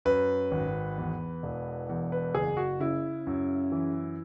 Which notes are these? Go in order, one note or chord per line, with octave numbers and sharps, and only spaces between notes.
F#2 B4
G#1
E2
E1
E2
B4
F#1 G#4
F#4
C#3 E4
F#2
E3